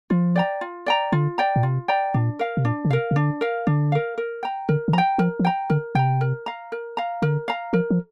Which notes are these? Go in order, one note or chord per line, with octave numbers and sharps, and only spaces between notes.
F3 F4
D5 G5 A#5
F4
D5 G5 A#5
D3 F4
D5 G5 A#5
A#2
C3 F4
D5 G5 A#5
A#2 D4
A#4 F5
C3
A#2 D4
D3
C3 A#4 F5
C3
D3 D4
A#4 F5
D3 D4
A#4 F5
A#4
G5 A#5
D3 A#4
D3
F3 G5 A#5
F3 A#4
F3
G5 A#5
D3 A#4
C3 G5 A#5
A#4
F5 A#5
A#4
F5 A#5
D3 A#4
F5 A#5
F3 A#4
F3